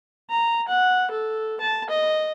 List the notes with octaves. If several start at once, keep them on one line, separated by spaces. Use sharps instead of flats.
A#5
F#5
A4
A5
D#5